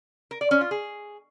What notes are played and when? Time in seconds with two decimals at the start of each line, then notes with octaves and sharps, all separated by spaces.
0.31 A#4
0.41 D5
0.51 C#4
0.61 F4
0.71 G#4